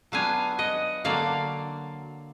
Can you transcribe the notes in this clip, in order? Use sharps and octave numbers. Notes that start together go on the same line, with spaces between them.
F#3 B3 D4 F4 F5 G#5
D#5 F#5
D3 F#3 A#3 D5 F5